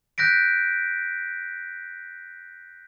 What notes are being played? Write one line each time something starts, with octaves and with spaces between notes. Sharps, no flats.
F#6 G6 A#6 B6 D7